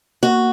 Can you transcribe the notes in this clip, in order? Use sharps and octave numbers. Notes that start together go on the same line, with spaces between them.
A#3 F#4